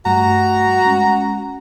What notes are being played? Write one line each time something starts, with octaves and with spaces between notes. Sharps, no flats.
G2 G3 A3 F#4 A#5
G#3 C#4